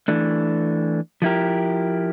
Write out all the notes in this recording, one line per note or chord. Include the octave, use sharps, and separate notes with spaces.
E3 A3 D4
F3 A3 E4 G4 A#4